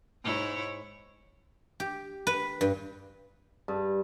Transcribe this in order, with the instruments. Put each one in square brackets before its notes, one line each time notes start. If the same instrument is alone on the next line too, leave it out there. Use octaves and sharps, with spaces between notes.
[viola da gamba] G#2 E4 C#5
[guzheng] G4
B4
G2
[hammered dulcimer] G2